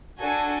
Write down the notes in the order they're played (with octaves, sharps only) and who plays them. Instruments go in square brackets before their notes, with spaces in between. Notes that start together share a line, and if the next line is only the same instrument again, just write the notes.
[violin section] D4 F#4 A4 G#5